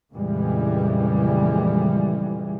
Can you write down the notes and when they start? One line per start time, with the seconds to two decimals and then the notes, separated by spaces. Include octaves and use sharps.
0.13 F2 A#2 C#3 E3 G3 G#3